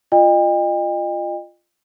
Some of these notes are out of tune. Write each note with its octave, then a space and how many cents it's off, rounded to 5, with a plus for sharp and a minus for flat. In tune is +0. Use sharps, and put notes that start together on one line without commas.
F4 -5 D#5 -30 G5 +40